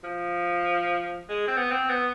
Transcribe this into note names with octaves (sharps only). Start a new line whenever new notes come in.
F3
G#3
C4
B3
C4
B3